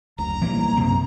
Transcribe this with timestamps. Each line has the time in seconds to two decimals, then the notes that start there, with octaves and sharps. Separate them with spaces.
0.18 F#1 D2 A#5
0.42 B1 A#2 E3 G3 A#3
0.76 F#2 C3 C4